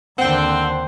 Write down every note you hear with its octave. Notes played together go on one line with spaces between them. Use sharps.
D#2 D3 C4 C5 F#5 G5